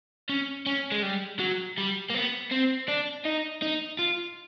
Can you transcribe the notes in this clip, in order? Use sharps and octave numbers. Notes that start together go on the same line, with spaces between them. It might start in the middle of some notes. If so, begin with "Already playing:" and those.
C#4
C#4
G#3
G3
F#3
G3
A#3
B3
C4
D4
D#4
D#4
F4